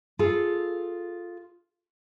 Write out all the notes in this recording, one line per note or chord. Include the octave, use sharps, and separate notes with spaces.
F4 G#4 A4